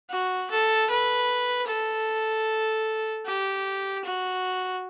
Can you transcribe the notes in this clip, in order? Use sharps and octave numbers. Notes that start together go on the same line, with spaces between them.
F#4
A4
B4
A4
G4
F#4